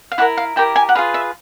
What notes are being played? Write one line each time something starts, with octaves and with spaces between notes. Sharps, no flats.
F5
E4 G4 A#4 F#5
F5
E4 G4 A#4 G5
G#5
F#5
F4 G#4 B4 F5
E5